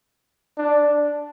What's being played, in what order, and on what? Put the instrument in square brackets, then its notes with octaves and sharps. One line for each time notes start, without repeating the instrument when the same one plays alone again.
[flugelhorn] D4